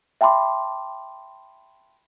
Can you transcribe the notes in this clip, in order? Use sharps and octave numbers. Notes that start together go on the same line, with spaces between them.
E5 G5 A5 B5 C6 D6